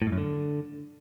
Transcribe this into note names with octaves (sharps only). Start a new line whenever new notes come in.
A2
G#2
F#2
D3